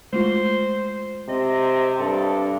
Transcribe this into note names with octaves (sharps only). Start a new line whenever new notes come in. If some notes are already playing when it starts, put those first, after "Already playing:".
G#3 A3 F4 C5
C3 D#5
G2 A4